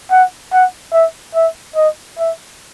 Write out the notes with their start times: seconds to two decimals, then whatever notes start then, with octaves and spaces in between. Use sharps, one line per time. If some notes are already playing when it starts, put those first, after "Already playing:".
0.11 F#5
0.53 F#5
0.93 E5
1.35 E5
1.76 D#5
2.18 E5